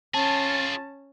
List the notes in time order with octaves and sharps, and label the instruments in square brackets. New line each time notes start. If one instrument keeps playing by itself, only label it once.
[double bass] C#4 [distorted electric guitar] F4 G#4 [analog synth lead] A5